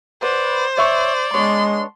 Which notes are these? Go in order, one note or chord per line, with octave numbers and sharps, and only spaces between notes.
B4 C5 D5 F#5
C#5 D5 E5 C#6
G#3 B3 D4 C#5 C6